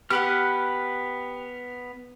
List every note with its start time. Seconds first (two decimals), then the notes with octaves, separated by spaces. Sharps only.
0.10 B3 G4 B4 F#5 F6